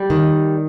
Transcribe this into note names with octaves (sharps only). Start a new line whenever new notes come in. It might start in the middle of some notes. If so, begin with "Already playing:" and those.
Already playing: G3
D#3